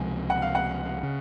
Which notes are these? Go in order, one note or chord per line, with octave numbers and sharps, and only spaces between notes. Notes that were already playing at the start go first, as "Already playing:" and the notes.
Already playing: C#2 C3 F3 G#3 G#5
F#5
F5
F#5
C#3